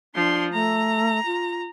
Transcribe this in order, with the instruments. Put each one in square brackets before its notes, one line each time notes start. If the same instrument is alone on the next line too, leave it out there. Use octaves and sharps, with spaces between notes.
[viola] F3 C6 [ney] D4
[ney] A3 [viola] A#5
[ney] F4